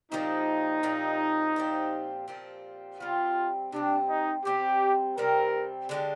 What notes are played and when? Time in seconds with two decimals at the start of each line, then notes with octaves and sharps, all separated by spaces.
0.11 A#2 F3 C4 D#4 G4
0.83 A#2 F3 C4 G4
1.56 A#2 F3 C4 G4
2.28 A#2 F3 C4 G4
3.00 C3 G3 C4 F4
3.72 C3 G3 C4 D4
4.09 D#4
4.45 C3 G3 C4 G4
5.17 C3 G3 C4 A#4
5.89 D3 G#3 D4 G4